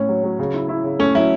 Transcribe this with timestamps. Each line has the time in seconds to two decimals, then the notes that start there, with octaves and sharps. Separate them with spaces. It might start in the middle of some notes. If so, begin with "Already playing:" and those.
Already playing: A2 C#4
0.09 F#3
0.24 F#3
0.39 C#3
0.54 E4
0.69 E4
0.84 C#3
0.99 A3 C#4
1.15 F#3 E4